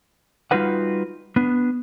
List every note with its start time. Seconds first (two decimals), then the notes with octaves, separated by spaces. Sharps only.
0.51 G3 D#4 F4 F#4 B4 F#5
1.36 B3 D4